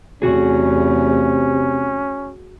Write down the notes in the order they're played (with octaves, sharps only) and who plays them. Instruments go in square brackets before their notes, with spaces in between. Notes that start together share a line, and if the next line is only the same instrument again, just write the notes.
[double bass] E2 A3 [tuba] C3 [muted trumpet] C#4 [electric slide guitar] F#4 G#4